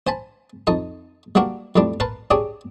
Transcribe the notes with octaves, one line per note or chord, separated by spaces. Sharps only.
C5 G#5 A5 B5
F2 D#4 A5
G3 A#3 D4 F#4 A#4
F2 A2 G3 D4
A#4 B4 A5 C6
D4 G4 G#4 C#5